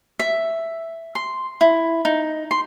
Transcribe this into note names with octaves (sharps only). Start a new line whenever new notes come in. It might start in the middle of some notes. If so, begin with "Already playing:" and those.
E5
C6
E4
D#4
C6